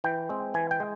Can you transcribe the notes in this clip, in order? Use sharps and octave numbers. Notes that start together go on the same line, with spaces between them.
E3 G5
G#3 C4
E3 G#5
G5
G#3